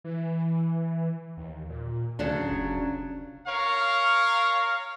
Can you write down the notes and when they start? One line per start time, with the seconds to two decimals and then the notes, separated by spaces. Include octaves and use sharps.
0.04 E3
1.37 D#2
1.70 A#2
2.19 D2 C#3 F#3 D4
2.51 F1
3.47 A#4 C#5 F5